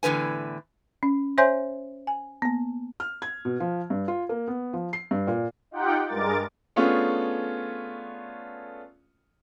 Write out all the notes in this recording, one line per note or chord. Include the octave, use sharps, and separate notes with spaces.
E2 A2 D3 B4 G#5
C#4
C5 C#5 E5 G#5 C6 G6
G#5
A#3 B3
F6
G#6
B2
F3
G2
F4
A#3
B3
F3
C7
G2
A#2
D#4 F4 G4 F#5 G5
G2 G#3 A#4 D6 A6
A3 B3 C#4 D4 F4 G#4